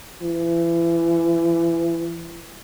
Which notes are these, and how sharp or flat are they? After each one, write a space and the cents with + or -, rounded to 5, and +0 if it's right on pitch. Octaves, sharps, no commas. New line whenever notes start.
E3 +30